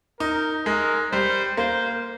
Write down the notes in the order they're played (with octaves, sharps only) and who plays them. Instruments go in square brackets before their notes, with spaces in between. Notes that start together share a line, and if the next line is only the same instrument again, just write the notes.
[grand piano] D#4 [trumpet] A#4
[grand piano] G#3 [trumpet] A#4
[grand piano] G3 [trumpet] C5
[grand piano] A#3 [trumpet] C5